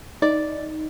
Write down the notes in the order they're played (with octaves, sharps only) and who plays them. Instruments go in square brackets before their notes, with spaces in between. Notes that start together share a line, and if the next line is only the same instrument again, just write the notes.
[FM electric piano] D#4 [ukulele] D5